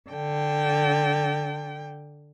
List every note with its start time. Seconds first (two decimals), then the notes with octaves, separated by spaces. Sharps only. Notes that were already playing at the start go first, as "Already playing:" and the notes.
0.10 D3 G5